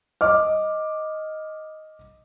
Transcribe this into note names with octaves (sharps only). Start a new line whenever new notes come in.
D#5 D6 F6